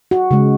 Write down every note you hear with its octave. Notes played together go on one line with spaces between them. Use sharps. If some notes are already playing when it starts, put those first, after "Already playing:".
F#4
C#3 G#3